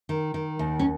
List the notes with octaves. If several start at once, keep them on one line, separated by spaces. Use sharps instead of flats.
D#3
D#3
D#2
C#4